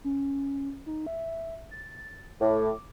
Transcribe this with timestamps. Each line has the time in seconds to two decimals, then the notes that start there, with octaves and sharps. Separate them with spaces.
0.04 C#4
0.86 D#4
1.07 E5
1.71 A6
2.41 A2 D6